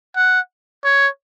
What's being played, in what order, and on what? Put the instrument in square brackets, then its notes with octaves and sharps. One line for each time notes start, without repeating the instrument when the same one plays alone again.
[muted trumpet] F#5
C#5